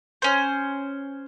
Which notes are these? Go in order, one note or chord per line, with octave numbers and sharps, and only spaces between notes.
C#4 C5